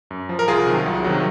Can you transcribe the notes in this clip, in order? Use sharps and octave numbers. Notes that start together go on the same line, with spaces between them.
F#2
F3
A#4
C2 F4 G#4
C3 D#3 F#3
C2
C3 D#3 F#3